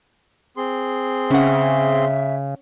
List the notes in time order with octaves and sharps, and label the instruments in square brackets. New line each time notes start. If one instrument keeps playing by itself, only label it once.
[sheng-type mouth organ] C4 G#4 C6
[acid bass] C#3 [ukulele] C#4 F#5 [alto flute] E5